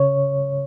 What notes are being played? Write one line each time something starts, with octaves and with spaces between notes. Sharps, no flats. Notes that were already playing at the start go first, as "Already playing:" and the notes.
Already playing: C#3 C#5